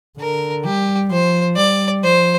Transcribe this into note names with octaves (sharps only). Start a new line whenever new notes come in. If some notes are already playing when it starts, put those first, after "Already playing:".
D3 A#4
G3 G4
F3 C5
G3 D5
F3 C5